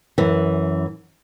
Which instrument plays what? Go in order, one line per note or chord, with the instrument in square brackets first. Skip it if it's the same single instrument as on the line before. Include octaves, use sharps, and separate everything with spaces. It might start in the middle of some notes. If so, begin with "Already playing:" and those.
[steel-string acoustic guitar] F#2 E3